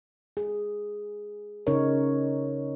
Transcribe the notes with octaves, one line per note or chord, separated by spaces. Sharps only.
G#4
C#3 C#4 D#4 A#4 C#5